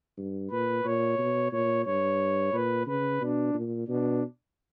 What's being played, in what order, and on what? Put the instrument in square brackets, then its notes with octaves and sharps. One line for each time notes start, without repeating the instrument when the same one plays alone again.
[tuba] G2
[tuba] A#2 [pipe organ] B4
[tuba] A#2 [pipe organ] C#5
[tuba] B2
[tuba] A#2 [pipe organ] C#5
[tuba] G2 [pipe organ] C#5
[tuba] A#2 [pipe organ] B4
[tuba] C#3 [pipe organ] B4
[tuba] B2 [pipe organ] D4
[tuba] A#2
[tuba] B2 [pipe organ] D4